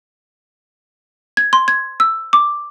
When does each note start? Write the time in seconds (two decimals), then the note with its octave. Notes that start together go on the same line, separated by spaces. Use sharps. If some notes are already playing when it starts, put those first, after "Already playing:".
1.37 G#6
1.53 C6
1.68 G#6
2.00 E6
2.33 D6